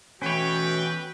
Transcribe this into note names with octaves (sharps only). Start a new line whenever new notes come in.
B2 E3 A3 C#4 F#4 B4 C#5 G5